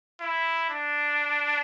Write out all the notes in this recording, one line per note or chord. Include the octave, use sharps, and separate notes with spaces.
E4
D4